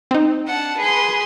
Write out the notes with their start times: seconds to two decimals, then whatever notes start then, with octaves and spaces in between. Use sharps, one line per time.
0.11 C4 D#4
0.47 D4 F#5 A5
0.78 G#4 B4 G#5 C6